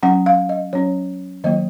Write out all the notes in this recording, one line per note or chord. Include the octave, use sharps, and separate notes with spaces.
F#3 C#4 F#5
F5
D#5
F#3 C#4 C#5
D#3 F#3 A#3 D#5